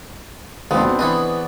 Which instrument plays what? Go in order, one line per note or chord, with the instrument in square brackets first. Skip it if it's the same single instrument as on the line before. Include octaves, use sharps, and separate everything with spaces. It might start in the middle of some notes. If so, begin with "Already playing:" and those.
[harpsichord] D#2 F3 G#3 [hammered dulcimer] B3 C4 D4
[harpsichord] B1
[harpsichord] E3 B4 D#5 [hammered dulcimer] G#4 D5 C#6